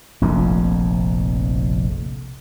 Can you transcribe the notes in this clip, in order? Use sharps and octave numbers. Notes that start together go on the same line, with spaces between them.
F1 A#1 F2